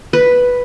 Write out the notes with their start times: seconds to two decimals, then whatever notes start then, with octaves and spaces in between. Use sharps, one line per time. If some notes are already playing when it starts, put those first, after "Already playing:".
0.13 B4